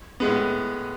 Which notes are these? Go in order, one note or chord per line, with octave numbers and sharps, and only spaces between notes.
A2 G#3 B3